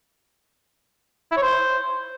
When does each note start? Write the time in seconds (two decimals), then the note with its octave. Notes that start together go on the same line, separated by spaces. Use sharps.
1.31 E4
1.37 C#5
1.42 C5